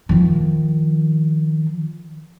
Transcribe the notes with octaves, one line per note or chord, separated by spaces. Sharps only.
D#3 F3